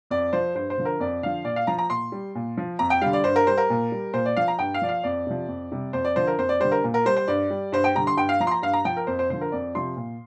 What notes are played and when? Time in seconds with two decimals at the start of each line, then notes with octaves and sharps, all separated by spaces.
0.11 F2 D5
0.33 F3 C5
0.55 G2 C5
0.70 C5
0.78 D3 F3
0.85 A#4
1.00 F2 D5
1.22 D3 F3 F5
1.45 A#2 D5
1.56 F5
1.67 F3 A#5
1.78 A#5
1.90 A#2 C6
2.12 G3
2.35 A#2
2.58 F3
2.79 F2 A#5
2.90 G5
3.01 D3 G3 F5
3.13 D5
3.24 G2 C5
3.36 A#4
3.47 G3 C5
3.58 A#4
3.70 A#2
3.92 G3
4.14 A#2 C5
4.26 D5
4.36 F3 F5
4.48 A#5
4.59 G2 G5
4.74 F5
4.82 F3 D5
4.89 F5
5.03 F2 D5
5.27 C3 F3
5.48 F2
5.72 C3 G3
5.93 F2 C5
6.05 D5
6.16 D3 F3 C5
6.27 A#4
6.38 F2 C5
6.49 D5
6.60 D3 G3 C5
6.72 A#4
6.84 A#2
6.94 A#4
7.06 G3 C5
7.16 C5
7.28 G2 D5
7.50 G3
7.72 G2 C5
7.84 G5
7.95 D3 G3 A#5
8.07 C6
8.17 G2 G5
8.29 F5
8.40 F3 A#5
8.47 C6
8.51 A#5
8.62 G2 F5
8.73 A#5
8.85 F3 G5
8.97 A#4
9.07 F2 C5
9.19 C5
9.30 D3 F3 C5
9.41 A#4
9.52 F2 D5
9.75 C3 F3 C6
9.97 A#2